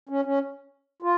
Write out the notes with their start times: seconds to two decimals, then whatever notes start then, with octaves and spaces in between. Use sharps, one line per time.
0.09 C#4
0.25 C#4
1.02 F4